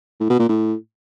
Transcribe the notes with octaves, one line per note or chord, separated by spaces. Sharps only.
A2
B2
A#2
A2